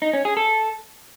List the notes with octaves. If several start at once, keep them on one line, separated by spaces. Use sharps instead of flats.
D#4
C#4
G#4
A4